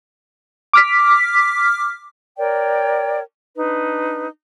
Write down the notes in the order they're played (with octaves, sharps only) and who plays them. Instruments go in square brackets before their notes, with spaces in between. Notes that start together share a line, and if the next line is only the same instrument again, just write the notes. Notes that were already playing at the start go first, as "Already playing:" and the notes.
[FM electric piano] D6 F6 B6
[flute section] A#4 C#5 D5 G5
D4 D#4 B4